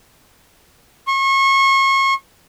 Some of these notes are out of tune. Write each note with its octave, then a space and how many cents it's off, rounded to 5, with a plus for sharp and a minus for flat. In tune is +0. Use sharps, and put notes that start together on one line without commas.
C#6 -35